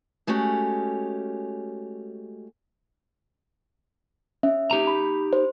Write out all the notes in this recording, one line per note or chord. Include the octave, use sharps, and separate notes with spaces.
G#3 A3 C#4 F#4 G4
C#4 E5
D#4 G4 A#5
B5
C5